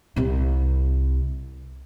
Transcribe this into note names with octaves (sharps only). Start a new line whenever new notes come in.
C2 C3